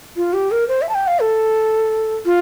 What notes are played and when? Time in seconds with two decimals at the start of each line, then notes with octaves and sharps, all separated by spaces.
0.17 F4
0.33 G4
0.51 A#4
0.68 C5
0.82 E5
0.89 A5
0.94 G5
1.07 F5
1.21 A4
2.25 F4